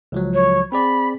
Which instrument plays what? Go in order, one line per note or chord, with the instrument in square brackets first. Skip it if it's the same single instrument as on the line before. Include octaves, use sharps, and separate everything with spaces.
[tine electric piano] C#2 F3 F#3
[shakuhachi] C#5
[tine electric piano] C4 G#4 D5 [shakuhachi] B5